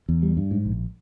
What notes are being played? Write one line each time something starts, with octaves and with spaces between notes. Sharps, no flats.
E2
G3
G2
G#2
A#1